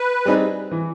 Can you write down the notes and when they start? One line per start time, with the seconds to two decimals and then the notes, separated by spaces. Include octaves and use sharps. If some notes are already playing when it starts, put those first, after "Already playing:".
Already playing: B4
0.25 G3 C4 D#4 G#4
0.71 E3